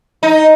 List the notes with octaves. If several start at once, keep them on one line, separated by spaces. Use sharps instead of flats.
D#4